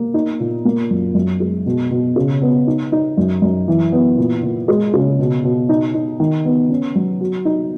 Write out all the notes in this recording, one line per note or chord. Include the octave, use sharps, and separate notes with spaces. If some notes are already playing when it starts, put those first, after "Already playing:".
Already playing: A#3
D#4
A#2
A#3
F#2
F#2
G#3
B2
B2
C#3
B3
D#4
D#4
F#2
F#2
E3
B3
A#2
A#2
G#3
C#3
B2
B2
D#4
D#4
D#3
B3
C#4
F#3
F#4
D#4